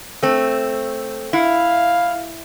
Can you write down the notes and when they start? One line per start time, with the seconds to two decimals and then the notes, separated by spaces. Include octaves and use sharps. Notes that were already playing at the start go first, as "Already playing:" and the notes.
0.23 A3 C4
1.33 E4 F5